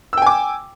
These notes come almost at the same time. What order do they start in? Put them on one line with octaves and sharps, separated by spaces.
E6 G5 G#5 D6